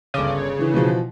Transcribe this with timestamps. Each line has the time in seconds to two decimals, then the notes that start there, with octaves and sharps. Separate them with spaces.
0.14 G1 C#3 D6 D#7
0.59 D3 E3
0.74 B2 E3 F3